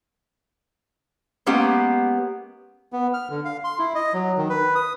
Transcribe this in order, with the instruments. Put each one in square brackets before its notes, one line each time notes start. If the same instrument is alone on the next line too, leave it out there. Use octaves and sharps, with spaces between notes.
[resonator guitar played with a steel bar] G#3 A#3 B3 C#4 G4 F5
[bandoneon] B3
F6
D3
F5
C6
E4
D#5
F#3
D#3
B4
D#6